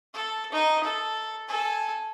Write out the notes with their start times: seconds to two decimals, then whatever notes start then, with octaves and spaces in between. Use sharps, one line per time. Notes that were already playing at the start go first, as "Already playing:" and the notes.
0.14 A4
0.52 D#4 D#5
0.84 A4
1.48 A4 G#5